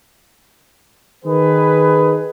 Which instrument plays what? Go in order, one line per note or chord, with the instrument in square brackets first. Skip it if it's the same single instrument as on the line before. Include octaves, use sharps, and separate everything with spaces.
[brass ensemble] D#3 G#4 B4